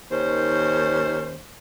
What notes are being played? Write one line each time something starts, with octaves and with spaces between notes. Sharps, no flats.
D#2 D#3 C#4 C5